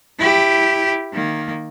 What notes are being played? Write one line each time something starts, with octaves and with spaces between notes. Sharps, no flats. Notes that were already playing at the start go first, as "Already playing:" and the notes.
E4 G4
D#3 A#3